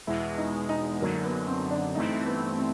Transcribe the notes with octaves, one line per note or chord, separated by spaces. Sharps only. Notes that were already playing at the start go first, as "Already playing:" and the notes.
E2 B2 G#3 E4
D#4
D#4
F#2 D3 F#3 A#3
B3
C4
D4
G2 E3 A3 C4 D#4 E4
B3
C4